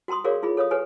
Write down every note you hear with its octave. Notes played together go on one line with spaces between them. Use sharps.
F#4 G5 A#5 C6 D#6
F#4 G#4 A#4 C#5 D5 F5
E4 F4 G#4 B5
A4 C#5 F5 D#6
G4 A4 B4 C#5 G#5